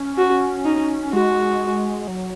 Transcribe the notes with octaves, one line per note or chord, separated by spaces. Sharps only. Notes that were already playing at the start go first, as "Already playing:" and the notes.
Already playing: C#4
F#4
D#4
G#3 F#4
F#3